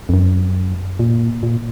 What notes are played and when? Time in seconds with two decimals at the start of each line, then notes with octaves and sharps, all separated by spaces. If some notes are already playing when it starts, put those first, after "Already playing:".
0.09 F2
0.14 F#2
0.99 A#2
1.43 A#2